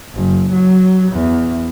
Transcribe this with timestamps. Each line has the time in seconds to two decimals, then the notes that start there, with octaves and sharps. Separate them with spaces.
0.14 F#1
0.52 F#3
1.12 E2